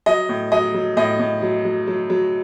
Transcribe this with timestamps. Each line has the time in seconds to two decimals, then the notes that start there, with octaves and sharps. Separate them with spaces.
0.06 F#3 D#5
0.29 A2
0.52 F#3 D#5
0.74 F#3
0.97 A2 D#5
1.19 A2
1.42 F#3
1.65 F#3
1.87 F#3
2.10 F#3